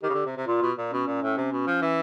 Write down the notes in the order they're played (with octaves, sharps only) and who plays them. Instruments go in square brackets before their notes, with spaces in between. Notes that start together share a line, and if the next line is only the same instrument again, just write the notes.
[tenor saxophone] D#3 [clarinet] G4
[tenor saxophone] C#3
D3
C3
C3
[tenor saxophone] A#2 [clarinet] F4
[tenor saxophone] B2
A#2
[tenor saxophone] B2 [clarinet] C#4
[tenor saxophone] A#2
A2
C3
B2
F3
E3